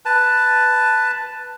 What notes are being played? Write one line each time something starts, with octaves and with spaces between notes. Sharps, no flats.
B4 A5